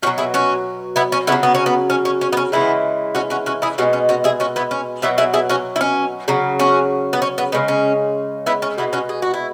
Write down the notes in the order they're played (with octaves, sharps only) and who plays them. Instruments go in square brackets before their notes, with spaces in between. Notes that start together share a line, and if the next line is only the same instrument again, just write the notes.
[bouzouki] B2 C#4 F#4
F#3
E4 G#4
C#4 F#4
B3 E4
C#4
C#3 F#3 B3 E4
B3
C#4
B3
C#4
C#4
C#4
B3
C#4
C#3 E3 G#3 B3 E4
C#4 F#4
C#4 F#4
C#4 F#4
E4 G#4
B2 G#3 C#4 F#4
C#4
C#4 F#4
E4 G#4
C#4 F#4
B3 E4
C#4
B2 F#3 B3 E4
E4 G#4
E4 G#4
C#4 F#4
E4
C#4
C#3 F#3
C#4 F#4
B3
C#4
B3
C#3 G#3 B3
C#4
B3 E4
C#4
B2 G#3 B3 E4
C#4 F#4
G#4
F#4
E4